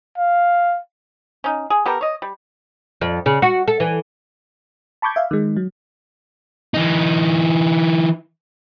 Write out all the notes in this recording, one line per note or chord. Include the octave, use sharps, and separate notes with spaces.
F5
C#4 D#4
G#4
B3 G4 A4 A#4
C#5 D#5
G3
F2
C#3
F#4
A4
E3
A5 B5 C#6 D6 G6 G#6
E5 F5
D#3 G#3
F#3
E3 D#4